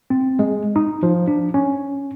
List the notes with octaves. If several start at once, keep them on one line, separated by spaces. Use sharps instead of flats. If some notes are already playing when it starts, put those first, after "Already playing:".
C4
G#3
D#4
F3
D4
C#4